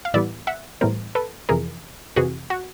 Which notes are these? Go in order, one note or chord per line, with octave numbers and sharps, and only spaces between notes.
F5
A2 E3 G3 B3 D5 E5
E5 F#5
A2 E3 G3 B3 A#4 C5
A4 B4
F2 C3 E3 G#4 A#4
F2 C3 E3 F#4 G#4
F#4